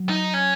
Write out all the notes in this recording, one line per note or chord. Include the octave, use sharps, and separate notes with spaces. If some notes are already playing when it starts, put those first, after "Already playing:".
Already playing: F#3
D#4
C#4